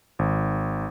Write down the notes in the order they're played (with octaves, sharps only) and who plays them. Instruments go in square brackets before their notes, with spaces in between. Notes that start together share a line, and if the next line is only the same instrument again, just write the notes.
[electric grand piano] G#1